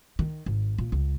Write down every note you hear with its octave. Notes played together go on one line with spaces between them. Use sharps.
D#3
G#1
A#2
C#2